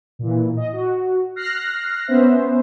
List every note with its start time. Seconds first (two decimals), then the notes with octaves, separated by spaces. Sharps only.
0.19 A#2 E3
0.57 D#5
0.73 F#4
1.36 F6 F#6 A#6 C7
2.08 B3 C#4 C5 E5